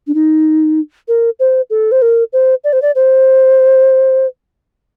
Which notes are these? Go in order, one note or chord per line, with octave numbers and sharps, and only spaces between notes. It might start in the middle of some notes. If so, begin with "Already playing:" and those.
D4
D#4
A#4
C5
A4
C5
A#4
C5
D5
C5
D5
C5